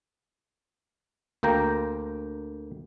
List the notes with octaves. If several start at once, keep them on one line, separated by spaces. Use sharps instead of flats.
D2 A#3 G5 A#5